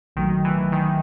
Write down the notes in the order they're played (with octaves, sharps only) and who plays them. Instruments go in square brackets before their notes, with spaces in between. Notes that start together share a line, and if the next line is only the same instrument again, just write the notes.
[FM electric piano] A#1 A#2 F#3 A3 [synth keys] D#3
[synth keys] E3
D#3